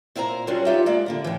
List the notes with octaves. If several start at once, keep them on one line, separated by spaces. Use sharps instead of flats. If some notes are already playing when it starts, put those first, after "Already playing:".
A#2 E4 C5 G#5 A#5
F#3 G3 C#4 D4 F4 F#4
B3 D#4 F4 G4 E5
G#3 A#3 D5
D3 A#3 E4
A2 E3